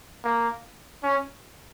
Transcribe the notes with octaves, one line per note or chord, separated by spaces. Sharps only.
A#3
C#4